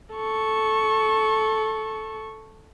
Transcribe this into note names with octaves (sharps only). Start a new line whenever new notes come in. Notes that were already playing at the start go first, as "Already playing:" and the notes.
A4 C#6